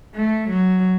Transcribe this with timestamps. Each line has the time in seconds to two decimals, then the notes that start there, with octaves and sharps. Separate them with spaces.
0.15 A3
0.49 F#3